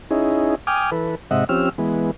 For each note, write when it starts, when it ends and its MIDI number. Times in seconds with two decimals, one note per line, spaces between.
0.11 0.55 61
0.11 0.55 63
0.11 0.55 64
0.11 0.55 68
0.67 0.90 79
0.67 0.90 80
0.67 0.90 86
0.67 0.90 87
0.67 0.90 89
0.92 1.15 52
0.92 1.15 69
0.92 1.15 71
1.31 1.44 44
1.31 1.44 48
1.31 1.44 75
1.31 1.44 76
1.31 1.44 78
1.49 1.69 53
1.49 1.69 60
1.49 1.69 61
1.49 1.69 67
1.49 1.69 88
1.49 1.69 89
1.78 2.11 52
1.78 2.11 56
1.78 2.11 59